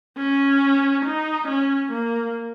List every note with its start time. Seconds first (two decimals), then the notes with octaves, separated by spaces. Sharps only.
0.18 C#4
1.05 D#4
1.48 C#4
1.92 A#3